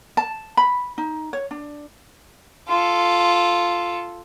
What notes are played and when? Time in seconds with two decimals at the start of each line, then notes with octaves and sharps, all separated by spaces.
0.17 A5
0.57 B5
0.98 D#4
1.33 C#5
1.51 D4
2.68 F4 A4